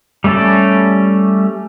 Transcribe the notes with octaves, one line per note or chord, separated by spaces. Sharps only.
G3 A3 C#4 A4 D5